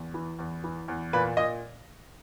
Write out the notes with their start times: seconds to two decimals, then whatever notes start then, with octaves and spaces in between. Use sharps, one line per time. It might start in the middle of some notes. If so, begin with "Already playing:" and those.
Already playing: E2
0.14 E3
0.39 E2
0.64 E3
0.88 E2
1.13 A#2 B4
1.37 A#2 D#5